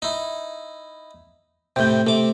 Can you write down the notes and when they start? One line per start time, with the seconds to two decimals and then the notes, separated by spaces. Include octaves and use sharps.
0.02 D#4 E4
1.76 A2 C3 G5 G6
2.07 C3 A3 D6